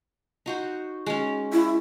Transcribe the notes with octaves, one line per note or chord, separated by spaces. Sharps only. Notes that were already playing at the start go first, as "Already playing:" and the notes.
D#4 F#4 C5
G#3 C#4
E4